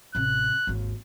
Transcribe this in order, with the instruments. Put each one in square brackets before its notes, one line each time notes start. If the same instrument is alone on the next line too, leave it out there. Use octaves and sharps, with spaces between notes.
[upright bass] A1 C3 [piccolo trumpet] F#6
[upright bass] G#1 D#2